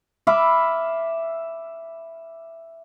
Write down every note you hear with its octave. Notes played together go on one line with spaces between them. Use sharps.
E5 F5 B5 D6